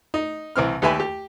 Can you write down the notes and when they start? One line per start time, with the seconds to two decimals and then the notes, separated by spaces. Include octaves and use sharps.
0.14 D#4
0.56 C2 E3 C4 F6
0.82 D#2 G4 B4 E5 G#5 B5
1.00 G4